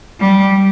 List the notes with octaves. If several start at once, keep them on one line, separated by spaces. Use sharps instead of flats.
G3